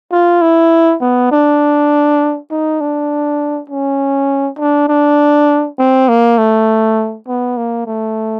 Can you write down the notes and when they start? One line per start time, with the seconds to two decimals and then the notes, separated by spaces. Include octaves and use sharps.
0.12 F4
0.42 E4
1.01 B3
1.32 D4
2.51 D#4
2.80 D4
3.70 C#4
4.59 D4
4.88 D4
5.78 C4
6.08 A#3
6.38 A3
7.27 B3
7.57 A#3
7.86 A3